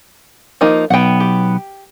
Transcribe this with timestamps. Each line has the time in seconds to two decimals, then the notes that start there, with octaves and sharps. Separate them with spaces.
0.61 F3 A#3 D#4
0.90 B1 B3 F#5 G5
1.20 G4